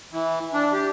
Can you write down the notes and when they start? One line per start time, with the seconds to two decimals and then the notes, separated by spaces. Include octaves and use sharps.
0.12 E3
0.54 D4
0.73 G4